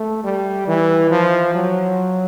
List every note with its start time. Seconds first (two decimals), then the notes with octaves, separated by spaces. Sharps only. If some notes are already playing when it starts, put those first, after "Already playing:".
Already playing: A3
0.24 G3
0.67 E3
1.11 F3
1.55 F#3